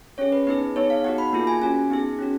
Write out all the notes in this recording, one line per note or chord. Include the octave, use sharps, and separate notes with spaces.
C#4 G#4 C#5
B4
B3 D#4 G#4 B4
B3 D#4 G#4 C#5
F5
B3 D#4 F#4 F#5
B5
A#3 F4 G#4
G#5
C#4 F#4 G#5
B3 D#4 G#4
C#4 F#4